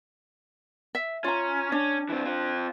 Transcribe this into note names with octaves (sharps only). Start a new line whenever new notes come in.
E5
C#4 F4 A#5
C#4 D4
E3 C4
C4 F4